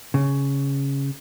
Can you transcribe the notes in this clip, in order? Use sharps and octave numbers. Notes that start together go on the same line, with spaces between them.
C#3